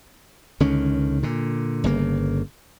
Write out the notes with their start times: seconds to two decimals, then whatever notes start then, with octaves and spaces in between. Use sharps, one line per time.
0.60 C#2 D3 D#3 C#4
1.23 A#2 D3
1.84 G1 C#3 A#3